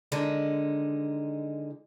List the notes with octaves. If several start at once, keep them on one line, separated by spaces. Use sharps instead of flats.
D3 D#3 G#3 D#4